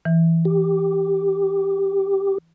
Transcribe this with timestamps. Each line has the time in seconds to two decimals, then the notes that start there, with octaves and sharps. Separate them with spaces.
0.05 E3
0.45 G4